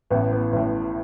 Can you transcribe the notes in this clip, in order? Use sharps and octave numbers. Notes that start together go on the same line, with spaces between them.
A1 A2 B3
B3
A1 A2